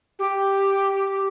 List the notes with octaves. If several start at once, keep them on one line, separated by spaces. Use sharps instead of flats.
G4